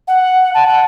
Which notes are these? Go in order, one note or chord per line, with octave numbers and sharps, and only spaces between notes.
F#5
A5
F#5